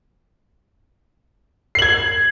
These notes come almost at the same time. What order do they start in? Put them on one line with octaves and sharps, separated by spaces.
C7 F#7 G#6